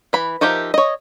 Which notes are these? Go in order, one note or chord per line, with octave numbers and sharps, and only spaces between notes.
E3 B5
F3 D#4 G4 A#4 E5
C#5 D#5